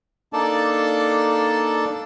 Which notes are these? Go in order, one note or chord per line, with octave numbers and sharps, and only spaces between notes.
A#3 D4 D#4 A4 D5 A5